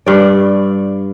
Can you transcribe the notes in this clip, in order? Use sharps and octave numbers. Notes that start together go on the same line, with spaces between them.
G2 D5